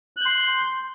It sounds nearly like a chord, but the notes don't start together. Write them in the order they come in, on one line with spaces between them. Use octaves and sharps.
F#6 G6 C6